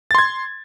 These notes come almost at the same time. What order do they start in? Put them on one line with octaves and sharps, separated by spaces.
A6 C6 G#6